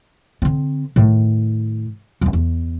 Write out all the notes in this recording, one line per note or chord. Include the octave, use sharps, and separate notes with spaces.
D3 C4
A2 D#3
D#1 C#4
E2